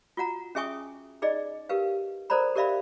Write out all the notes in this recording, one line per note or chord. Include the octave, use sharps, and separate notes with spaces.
F4 F#4 F#5 A#5
C#4 G#4 E5 G#5 C#6 D#6
D#4 G#4 D5 D#5
G4 A#4 B4 F5
A4 A#4 C5 D5 A#5 B5
G4 A#4 D5 E5 F5 B5